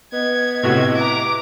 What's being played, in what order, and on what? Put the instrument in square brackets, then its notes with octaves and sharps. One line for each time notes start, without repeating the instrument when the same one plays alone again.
[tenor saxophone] B3 [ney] D#5 [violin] G#6
[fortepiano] A2 C3 F#4
[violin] A#5 D6